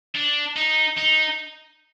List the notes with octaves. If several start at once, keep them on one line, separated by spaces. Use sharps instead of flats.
D4
D#4
D#4